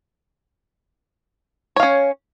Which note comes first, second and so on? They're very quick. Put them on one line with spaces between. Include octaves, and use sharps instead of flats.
C#5 F5 C#4